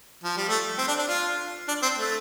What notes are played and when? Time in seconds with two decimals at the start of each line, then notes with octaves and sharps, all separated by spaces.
0.24 F3
0.37 G3
0.48 A3
0.78 C4
0.88 D4
0.98 D4
1.08 F4
1.68 D4
1.82 C4
1.98 A3